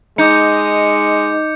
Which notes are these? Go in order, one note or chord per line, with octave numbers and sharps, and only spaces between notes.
G#3 D#4 D6 G6 C#7